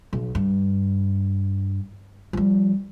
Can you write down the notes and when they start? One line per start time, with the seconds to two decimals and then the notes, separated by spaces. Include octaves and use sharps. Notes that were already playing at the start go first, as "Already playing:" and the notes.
0.13 B1
0.35 G2
2.33 F3 G3